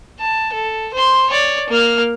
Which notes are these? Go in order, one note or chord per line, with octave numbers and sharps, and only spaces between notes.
A5
A4
C5 C6
C#5 D5
A#3 F6